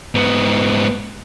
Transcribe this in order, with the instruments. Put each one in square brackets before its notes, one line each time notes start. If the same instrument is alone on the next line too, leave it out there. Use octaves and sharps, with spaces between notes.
[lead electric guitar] G#2 B3